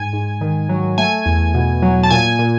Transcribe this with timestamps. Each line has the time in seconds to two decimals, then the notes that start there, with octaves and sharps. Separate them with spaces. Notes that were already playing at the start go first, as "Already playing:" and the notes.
Already playing: G#2 G#5
0.13 G#2
0.41 D#3
0.69 F#3
0.98 A3 G#5
1.26 E2
1.54 B2
1.82 F#3
2.03 A5
2.11 A#2 G#5
2.39 A#2